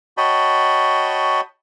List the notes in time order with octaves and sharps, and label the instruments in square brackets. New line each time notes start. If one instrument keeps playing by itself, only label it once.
[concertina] F#4 C#5 D#5 G5 A5 B5